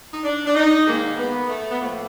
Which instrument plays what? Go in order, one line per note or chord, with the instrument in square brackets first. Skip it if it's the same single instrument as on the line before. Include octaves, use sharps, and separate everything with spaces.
[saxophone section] D#4
D4
D4
D#4
G#2 D#3 G#3 A#3
B3
A3
B3
A2 F3 A3 A#3